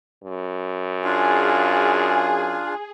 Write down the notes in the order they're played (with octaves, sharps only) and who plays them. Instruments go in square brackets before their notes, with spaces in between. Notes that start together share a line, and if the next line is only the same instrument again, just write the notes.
[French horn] F#2
[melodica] D4 F4 F5 [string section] G#4